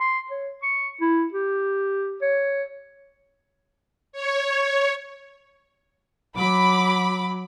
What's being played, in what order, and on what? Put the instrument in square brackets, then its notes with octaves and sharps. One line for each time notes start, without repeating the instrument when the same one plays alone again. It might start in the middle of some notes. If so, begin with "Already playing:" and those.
[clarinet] C6
C#5
C#6
E4
G4
C#5
[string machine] C#5
[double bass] F#3 [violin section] B5 D6